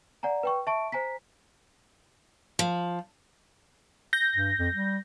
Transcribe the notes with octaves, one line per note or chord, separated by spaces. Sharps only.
D5 F#5 G#5 A#5
B4 G5 C#6
E5 A5 C#6 D7
C5 G#5 A#5 B6
F3
G6 A#6
G2
F2
G3